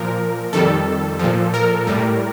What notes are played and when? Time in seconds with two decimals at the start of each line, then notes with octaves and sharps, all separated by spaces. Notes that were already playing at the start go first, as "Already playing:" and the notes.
Already playing: A#2 F3 A#4
0.53 F2 D#3 G3 A4
1.19 A#2 F3
1.54 A#4
1.87 A2 G3